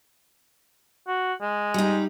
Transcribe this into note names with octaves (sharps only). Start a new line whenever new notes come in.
F#4
G#3
G3 D#4